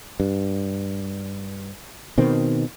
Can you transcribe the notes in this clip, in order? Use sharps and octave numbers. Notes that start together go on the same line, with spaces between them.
G2
B2 D#3 C4